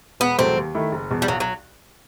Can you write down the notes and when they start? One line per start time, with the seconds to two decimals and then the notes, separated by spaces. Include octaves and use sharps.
0.20 E1 B3
0.38 E2 B2 F#3 A3 C4
0.57 D#2
0.75 D#3 A3 E4
0.92 F#1
1.10 E2 B2
1.22 G3
1.28 B1 F#3
1.40 F#3